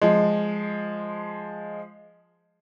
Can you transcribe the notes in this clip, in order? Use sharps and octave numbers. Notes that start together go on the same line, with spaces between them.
F3 G#3